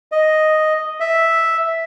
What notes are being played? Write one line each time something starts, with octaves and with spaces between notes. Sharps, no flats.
D#5
E5